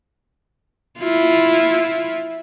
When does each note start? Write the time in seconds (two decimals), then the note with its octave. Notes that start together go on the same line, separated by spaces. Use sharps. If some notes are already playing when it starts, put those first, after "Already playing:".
0.99 E4 F4